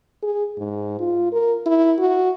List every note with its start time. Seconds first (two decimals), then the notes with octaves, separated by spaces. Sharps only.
0.23 G#4
0.57 G#2
0.99 F4
1.32 A#4
1.66 E4
1.98 F#4